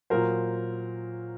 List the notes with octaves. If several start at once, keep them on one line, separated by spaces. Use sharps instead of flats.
A#2 F#3 A#4 C5